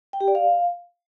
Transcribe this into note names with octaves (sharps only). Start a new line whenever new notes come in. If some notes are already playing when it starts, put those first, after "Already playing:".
G5
G4
D5
F5